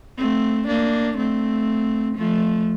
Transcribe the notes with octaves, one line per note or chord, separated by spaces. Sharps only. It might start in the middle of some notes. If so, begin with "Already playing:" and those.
A3 C4
A#3 D4
A3 C4
F3 A3